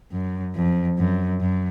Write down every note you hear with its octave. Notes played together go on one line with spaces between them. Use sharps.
F#2
F2
F#2
F#2